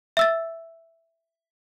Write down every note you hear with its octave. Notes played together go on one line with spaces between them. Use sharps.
E5 E6 A6